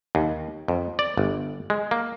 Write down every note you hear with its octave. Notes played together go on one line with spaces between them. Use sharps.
D#2
F2
D5
G1
G#3
A#3